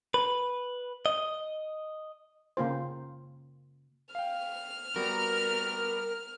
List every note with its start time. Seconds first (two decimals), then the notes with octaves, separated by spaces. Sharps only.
0.14 B4
1.06 D#5
2.57 C#3 A#3 F4 C5
4.15 F5 G5 F6
4.96 G3 B3 F#4 A#4